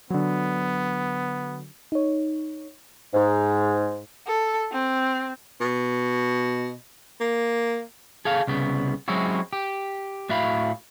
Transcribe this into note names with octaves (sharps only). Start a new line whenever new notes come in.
D3 F#3 B3
D#4 C#5
G#2
A4
C4
B2
A#3
G#4 A4 F5
C2 C#3 B3
F#3 G#3 C4 C#4 E4 F#4
G4
A2 F#4 E5 F5 B5